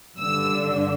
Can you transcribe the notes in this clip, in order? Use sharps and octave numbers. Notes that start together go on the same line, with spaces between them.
G2 D3 E6